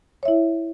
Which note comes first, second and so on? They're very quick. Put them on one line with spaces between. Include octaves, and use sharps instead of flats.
C#5 E5 E4